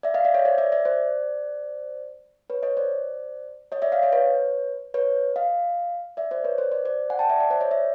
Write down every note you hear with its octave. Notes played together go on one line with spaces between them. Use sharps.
D5 E5
D#5 F5
D5 E5
C#5 D#5
C5 D5
D5 E5
D5 E5
C5 D5
B4 C#5
C#5 D#5
C5 D5
C#5 D#5
D5 E5
D#5 F5
C#5 D#5
B4 C#5
B4 C#5
D#5 F5
D5 E5
C5 D5
B4 C#5
C5 D5
C5 D5
C5 D5
F#5 G#5
G5 A5
D5 E5
D5 E5
C5 D5
C#5 D#5
D5 E5